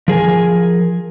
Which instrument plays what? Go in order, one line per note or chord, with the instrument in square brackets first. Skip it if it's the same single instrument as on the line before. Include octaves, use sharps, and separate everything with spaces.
[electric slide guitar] F3 G#4 A#4 G#5